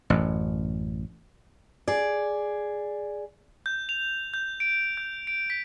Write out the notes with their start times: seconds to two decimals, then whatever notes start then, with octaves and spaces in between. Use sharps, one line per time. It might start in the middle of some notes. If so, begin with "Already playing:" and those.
0.10 A1 F#2
1.88 G#4 D5
3.66 G6
3.89 F7
4.34 G6
4.60 D7
4.97 G6
5.27 D7
5.50 B6